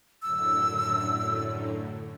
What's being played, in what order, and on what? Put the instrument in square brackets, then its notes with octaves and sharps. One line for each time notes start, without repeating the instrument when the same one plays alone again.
[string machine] F#2 A2 D3 [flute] E6